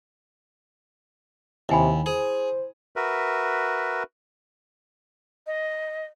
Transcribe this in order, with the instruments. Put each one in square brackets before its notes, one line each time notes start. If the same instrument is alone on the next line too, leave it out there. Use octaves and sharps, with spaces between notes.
[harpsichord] D#2 [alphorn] C3 [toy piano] E4 G#5 B5
[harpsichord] G#4 [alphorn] C5
[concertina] F#4 A#4 B4 E5
[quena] D#5